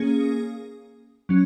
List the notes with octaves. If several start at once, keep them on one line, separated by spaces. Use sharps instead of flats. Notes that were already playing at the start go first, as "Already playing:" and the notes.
Already playing: A#3 C#4 G#4
F#3 C#4